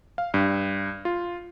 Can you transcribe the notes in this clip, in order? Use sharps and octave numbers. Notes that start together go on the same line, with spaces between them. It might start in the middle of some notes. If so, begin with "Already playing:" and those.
F5
G2
F4